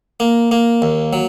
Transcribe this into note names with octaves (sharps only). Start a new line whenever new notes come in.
A#3
A#3
D#2
F#3